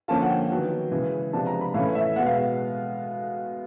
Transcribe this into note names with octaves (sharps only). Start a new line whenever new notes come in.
D3 F3 A#3 C#4 F4 A5
F#5
G5
D#3 F#3 B3
C#3 E3 G#3
C3 F3 G#3 B3 D4 A5
A#5
B5
A2 E3 A3 C#4 F5
E5
B2 G#3 B3 F#5
F5